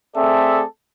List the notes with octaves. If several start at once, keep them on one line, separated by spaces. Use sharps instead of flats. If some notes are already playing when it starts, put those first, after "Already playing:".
A3 C4 G#4 A4 D5 E5